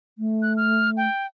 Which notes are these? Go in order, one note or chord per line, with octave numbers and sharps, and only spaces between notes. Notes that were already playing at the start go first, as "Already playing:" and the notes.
A3
F#6
F6
G5